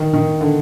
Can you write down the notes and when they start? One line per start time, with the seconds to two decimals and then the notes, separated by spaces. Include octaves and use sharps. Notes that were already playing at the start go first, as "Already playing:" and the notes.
Already playing: D#3
0.13 D#3
0.41 D3